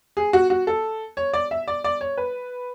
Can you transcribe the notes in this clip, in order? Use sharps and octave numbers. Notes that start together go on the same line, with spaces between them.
G#4
F#4
F#4
A4
C#5
D5
E5
D5
D5
C#5
B4